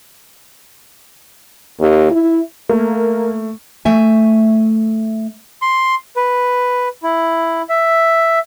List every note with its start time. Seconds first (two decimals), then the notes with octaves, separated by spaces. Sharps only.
1.80 D#2
2.11 E4
2.69 A3 A#3
3.85 A3 E5 G#5
5.62 C6
6.16 B4
7.03 E4
7.69 E5